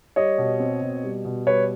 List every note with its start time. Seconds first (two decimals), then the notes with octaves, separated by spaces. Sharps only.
0.16 G3 C#5 D#5
0.38 B2
0.60 C4
0.81 B2
1.04 G3
1.25 B2
1.47 G3 B4 C#5